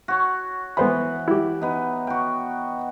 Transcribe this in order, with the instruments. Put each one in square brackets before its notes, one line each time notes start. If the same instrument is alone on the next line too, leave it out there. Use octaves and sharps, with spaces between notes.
[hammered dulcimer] F#4 C#5
[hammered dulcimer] E3 [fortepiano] B3 C5 B5
[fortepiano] E4 G4
[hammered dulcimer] B3 D#4
F#4 G5